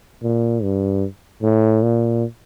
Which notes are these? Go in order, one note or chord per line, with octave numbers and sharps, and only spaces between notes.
A#2
G2
A2
A#2